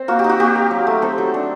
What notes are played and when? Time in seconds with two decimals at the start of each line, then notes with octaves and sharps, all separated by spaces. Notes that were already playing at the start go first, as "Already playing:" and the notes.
Already playing: C4
0.08 A#3 F#4
0.19 G4
0.24 D#4
0.29 F#4
0.40 A#3 G4
0.56 A#3
0.71 F#3
0.87 A3
1.02 C4 A4
1.18 F#3
1.34 D4